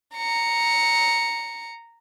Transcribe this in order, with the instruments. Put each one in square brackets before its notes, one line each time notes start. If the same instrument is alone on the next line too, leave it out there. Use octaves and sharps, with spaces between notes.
[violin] A#5 C#7